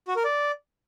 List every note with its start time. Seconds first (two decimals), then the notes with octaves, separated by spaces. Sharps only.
0.08 F#4
0.16 A#4
0.24 D5